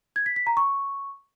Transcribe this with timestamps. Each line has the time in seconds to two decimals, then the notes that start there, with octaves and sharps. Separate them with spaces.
0.16 G#6
0.26 B6
0.36 B6
0.47 A#5
0.57 C#6